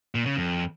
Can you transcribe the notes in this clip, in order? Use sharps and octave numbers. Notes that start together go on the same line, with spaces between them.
A#2
C#3
F2